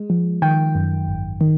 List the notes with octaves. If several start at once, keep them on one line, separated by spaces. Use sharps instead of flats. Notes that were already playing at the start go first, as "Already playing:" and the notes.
Already playing: G#3
F3
D#3 G5
F#2
G#1
D#3